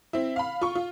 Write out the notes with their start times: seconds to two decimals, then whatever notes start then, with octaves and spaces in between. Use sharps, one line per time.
0.13 C4 E4
0.36 F5 B5
0.61 F4 C#6
0.75 F4